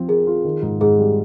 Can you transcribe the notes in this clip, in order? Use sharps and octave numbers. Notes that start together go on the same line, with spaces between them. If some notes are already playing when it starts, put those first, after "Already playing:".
Already playing: F3 C4 F4
G#4 A#4
F4
D#3
G#2
G#2 G#4
G3